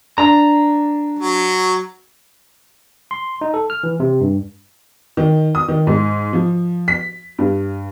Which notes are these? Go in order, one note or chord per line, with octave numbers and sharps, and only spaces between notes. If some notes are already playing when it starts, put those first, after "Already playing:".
D4 A#5
F#3
C6
D#4
A4
F6
E3
C3
G2
D#3
D#6
D#3
G#2
F3
B6
G2